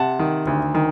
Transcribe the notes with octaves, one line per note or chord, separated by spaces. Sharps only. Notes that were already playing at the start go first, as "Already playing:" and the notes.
Already playing: C3 F#5 A5
D#3
D2
D#3